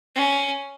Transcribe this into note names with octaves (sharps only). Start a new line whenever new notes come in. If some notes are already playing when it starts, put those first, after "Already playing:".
C#4